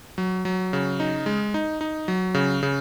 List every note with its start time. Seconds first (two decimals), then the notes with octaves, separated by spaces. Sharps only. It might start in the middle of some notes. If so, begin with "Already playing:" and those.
0.18 F#3
0.45 F#3
0.73 C#3
1.00 D#4
1.26 G#3
1.54 D#4
1.81 D#4
2.08 F#3
2.34 C#3
2.63 C#3